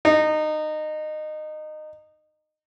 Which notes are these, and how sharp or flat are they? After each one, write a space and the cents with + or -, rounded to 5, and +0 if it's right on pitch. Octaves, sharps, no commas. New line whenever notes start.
D#4 -20